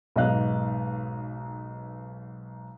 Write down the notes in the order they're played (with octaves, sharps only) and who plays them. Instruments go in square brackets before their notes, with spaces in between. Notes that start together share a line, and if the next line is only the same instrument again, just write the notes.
[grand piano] B1 G#2 B3 D#5 F5 F#6